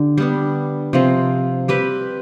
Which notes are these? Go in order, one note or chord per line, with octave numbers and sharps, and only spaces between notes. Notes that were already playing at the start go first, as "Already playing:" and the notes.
Already playing: D3 G4
G3 B3 D4
C3 F3 C4
G3 C4 G4 B4